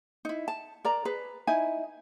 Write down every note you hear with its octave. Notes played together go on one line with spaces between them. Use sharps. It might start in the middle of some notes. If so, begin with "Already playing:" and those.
D#4 E4
A5
A#4 D5 A#5
G#4 B4
D#4 E4 G#5